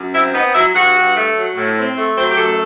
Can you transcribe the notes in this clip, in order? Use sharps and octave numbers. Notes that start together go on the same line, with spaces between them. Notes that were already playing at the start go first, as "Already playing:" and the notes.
Already playing: F#2
C4 E4 E5
B3 D#4 D#5
F#3 E4 E5
G2 F#4 F#5
G2
A3
F#3
A2
C4
A3
F#3 C4 C5
G4
F#2 A3 A4